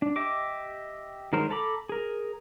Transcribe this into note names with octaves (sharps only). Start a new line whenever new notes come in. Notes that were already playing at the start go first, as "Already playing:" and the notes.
D4
G4 D#5 E5 D6
D#3 F#3 G#3 A#4 C5
A4 A#5 B5 D6
G#4 A#4